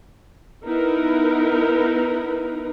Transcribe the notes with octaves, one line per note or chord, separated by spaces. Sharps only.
B3 D#4 E4 A#4 B4